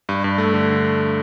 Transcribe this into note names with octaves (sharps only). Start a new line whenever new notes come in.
G2
G2
A3
D3